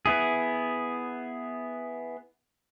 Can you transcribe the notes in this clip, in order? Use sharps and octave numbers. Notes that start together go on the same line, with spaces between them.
B3 E4 G#4